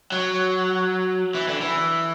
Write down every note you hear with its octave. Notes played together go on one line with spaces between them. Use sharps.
F#3
E3
D3
E3